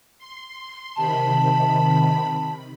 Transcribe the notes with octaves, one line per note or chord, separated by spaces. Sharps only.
C6
C3 D#3 A5 B5